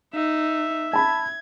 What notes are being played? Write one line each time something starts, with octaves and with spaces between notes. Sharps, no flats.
D#4 E5
A5 B5 G#6